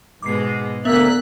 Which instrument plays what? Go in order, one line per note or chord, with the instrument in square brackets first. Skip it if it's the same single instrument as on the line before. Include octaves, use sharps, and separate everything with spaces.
[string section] G#2 B2 G#3 [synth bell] D6 C7
[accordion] D2 A#3 E5 [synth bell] B3 [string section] F#6 B6